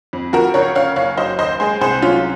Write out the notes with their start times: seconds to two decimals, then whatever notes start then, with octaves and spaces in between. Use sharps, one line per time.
0.13 F2
0.33 F3 F#4 A#4
0.54 C#2 A#4 C#5
0.75 C#3 C#5 F5
0.96 F#1 C#5 F5
1.17 F#3 C5 D#5
1.39 D#2 C5 D#5
1.60 G#3 G#4 C5
1.81 C2 G#4 C5
2.02 F#3 C#4 F4